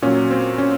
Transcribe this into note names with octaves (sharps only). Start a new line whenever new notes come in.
A#2 F#3 C#4
C4
C#4